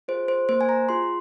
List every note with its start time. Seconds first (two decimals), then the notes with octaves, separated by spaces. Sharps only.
0.08 F4 G#4 C5
0.28 C5
0.49 A#3 C5
0.61 G#5
0.69 A#5
0.89 F4 G#4 C6